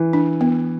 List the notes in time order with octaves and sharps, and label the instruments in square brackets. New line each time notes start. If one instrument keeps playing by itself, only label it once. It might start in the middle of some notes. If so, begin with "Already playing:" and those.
Already playing: [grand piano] E3
[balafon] D4
B3